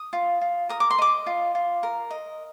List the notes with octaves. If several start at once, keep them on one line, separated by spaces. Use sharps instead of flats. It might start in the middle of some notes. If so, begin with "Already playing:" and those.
Already playing: D#6
F4
F4
A#4 D#6
D6
C6
D#5 D6
F4
F4
A#4
D#5